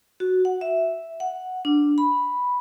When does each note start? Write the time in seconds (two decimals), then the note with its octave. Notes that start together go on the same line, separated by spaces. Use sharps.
0.20 F#4
0.45 F#5
0.61 E5
1.20 F#5
1.65 D4
1.98 B5